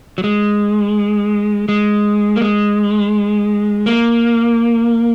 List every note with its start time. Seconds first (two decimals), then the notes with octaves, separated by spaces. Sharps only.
0.18 F#3
0.24 G#3
1.69 G#3
2.36 A#3
2.41 G#3
3.86 A#3